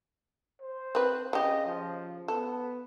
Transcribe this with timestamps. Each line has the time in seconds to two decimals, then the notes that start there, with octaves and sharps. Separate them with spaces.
0.61 C5
0.95 C4 B4
1.33 C#3 G4 D#5
1.66 F3
2.28 B3 A4